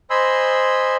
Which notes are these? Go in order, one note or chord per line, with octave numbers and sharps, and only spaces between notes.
C5 D#5 G#5 B5 C6 E6